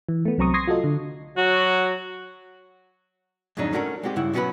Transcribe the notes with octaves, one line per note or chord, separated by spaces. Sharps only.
E3
A3 B3
C2 F#3 C4 A#5 C#6 D#6
C6 C#6 D#6 G#6 A#6 C7
F4 F#4 A4 D#5
D3
F#3 F#4
F2 G#2 C#3 F#3 D4 D#4
A3 C#4 D4 F#4 A4 A#4
G#3 C4 F#4 G4
G2 C#3 E4 F#5
B2 F#3 C#4 F4 F#4 B4